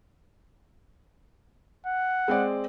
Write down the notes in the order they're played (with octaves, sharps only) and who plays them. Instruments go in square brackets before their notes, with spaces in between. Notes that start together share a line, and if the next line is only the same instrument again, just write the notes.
[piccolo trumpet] F#5
[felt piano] G#3 C4 D5